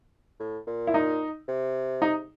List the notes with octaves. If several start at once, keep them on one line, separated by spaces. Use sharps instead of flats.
A2
A#2
E4
D#4
C3
D#4